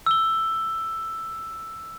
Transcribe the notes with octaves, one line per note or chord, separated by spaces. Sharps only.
E6 G7